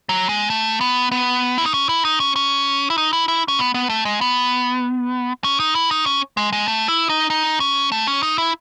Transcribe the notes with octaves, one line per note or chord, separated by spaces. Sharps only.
F#3
G#3
A3
B3
B3
E4
D#4
C#4
E4
D#4
C#4
C#4
E4
D#4
E4
E4
C#4
B3
B3
A3
G#3
B3
C#4
D#4
E4
D#4
C#4
G#3
G#3
A3
E4
D#4
D#4
C#4
A3
C#4
D#4
E4